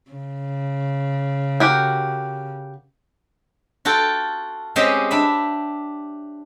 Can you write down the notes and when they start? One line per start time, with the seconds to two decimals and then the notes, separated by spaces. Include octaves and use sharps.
0.11 C#3
1.60 F#4 G4 A#4
3.85 F4 F#4 A4 G5
4.76 G#3 C4 C#4 G4 D#5
5.11 D4 E5 B5